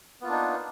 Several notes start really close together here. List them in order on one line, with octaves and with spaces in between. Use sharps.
B3 F4 A#3 D4 D#4